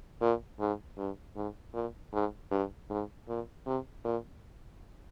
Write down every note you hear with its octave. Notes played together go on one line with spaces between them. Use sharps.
A#2
G#2
G2
G#2
A#2
G#2
G2
G#2
A#2
C3
A#2